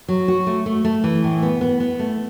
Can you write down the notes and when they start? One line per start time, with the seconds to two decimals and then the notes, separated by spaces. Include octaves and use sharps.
0.08 F#3
0.28 F#4
0.47 A3
0.66 A3
0.85 A3
1.04 E3
1.24 A2
1.42 B3
1.61 B3
1.80 B3
1.99 A3